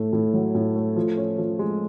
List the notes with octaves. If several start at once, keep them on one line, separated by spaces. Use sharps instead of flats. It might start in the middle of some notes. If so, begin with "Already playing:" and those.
Already playing: A2 A3
A2
F#3
A2
A3
F3
C#4
F3
G#3